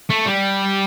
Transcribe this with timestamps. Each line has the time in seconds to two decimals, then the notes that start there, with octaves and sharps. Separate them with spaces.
0.10 A3
0.25 G3